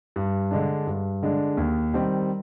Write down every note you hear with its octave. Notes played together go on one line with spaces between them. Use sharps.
G2
D3 G#3 D4
G2
D3 G#3 D4
D#2
D#3 G3 C4